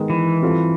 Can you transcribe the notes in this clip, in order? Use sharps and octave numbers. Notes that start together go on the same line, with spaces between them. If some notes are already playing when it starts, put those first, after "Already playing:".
Already playing: D#3 G#3 B3
E3
G3 C4 F4 A4